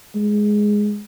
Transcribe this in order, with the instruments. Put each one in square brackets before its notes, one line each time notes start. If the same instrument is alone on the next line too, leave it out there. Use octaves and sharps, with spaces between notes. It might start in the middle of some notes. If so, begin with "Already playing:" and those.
[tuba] G#3